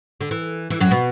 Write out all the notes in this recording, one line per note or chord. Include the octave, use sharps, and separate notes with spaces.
D3
E3
E3
F#2 F#3
B2 B3